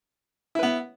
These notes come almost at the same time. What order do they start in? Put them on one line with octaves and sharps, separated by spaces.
E4 B4 B3